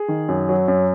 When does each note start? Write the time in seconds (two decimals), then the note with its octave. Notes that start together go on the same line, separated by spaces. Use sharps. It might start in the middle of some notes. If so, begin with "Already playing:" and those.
Already playing: G#4
0.08 D#3
0.28 F#2
0.49 F#3
0.68 F#2